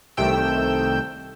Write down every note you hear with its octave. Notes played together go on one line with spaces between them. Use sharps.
C2 C3 D#3 A3 G5 E6